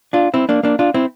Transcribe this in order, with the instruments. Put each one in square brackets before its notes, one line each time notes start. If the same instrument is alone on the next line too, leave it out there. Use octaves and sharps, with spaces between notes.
[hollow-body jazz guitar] D4 F4
C4 E4
A#3 D4
A#3 D4
D4 F4
C4 E4